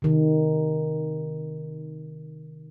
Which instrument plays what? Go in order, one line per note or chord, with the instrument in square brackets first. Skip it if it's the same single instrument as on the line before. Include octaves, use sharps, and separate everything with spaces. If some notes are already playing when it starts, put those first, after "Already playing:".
[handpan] C3 D#3